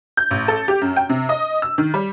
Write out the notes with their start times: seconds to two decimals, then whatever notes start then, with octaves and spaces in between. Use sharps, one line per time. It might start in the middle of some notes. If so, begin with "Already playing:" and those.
0.17 G6
0.31 A1
0.48 A4
0.68 G4
0.81 F#2
0.97 G5
1.09 C3
1.29 D#5
1.62 E6
1.78 D#3
1.94 G3